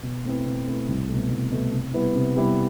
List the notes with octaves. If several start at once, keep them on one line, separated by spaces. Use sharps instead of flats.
B2
A3 C4 E4 B4
B2
A3 C4 E4 B4
C2
A3
B2
C2
B2 A3
C3
G3 B3 E4 B4
C3
G3 B3 E4 B4